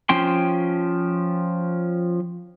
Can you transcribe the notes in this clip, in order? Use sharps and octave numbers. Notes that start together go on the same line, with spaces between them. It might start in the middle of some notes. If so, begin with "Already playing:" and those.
F3 C#4 G5 C6